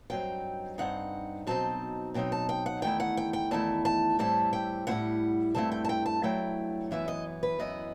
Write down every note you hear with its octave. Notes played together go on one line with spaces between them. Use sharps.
G2 F#3 C4 D#4 G5
G2 F#3 C4 D#4 F#5
B2 F#3 C4 D#4 A5
B2 F#3 C4 D#4 G5
A5
G5
F#5
E2 D#3 A3 E4 G5
F#5
G5
G5
E2 D#3 A3 E4 A5
A5
A2 G3 C4 E4 A5
G5
A2 G3 C4 E4 F#5
G2 F#3 A3 C4 E4 A5
G5
A5
G5
A5
G2 F#3 A3 E4 G5
F#2 E3 B3 E4 E5
D#5
B4
F#2 E3 B3 E4 D#5